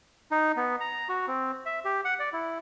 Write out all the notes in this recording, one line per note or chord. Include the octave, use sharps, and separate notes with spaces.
D#4
B3
A#5
F#4
C4
E5
G4
F#5
D5
E4